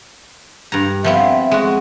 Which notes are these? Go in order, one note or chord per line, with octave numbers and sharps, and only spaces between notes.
G2 A#5
F3 B3 C4 E5
G#3 F#4